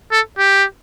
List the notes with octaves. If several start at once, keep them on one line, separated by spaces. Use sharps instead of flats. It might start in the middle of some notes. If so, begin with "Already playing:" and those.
A4
G4